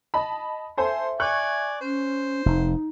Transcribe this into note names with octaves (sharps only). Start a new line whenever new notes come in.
D#5 A5 B5
A4 C5 E5 G#5 C6
D5 G#5 C#6 F#6
C#4 C5
F1 D#4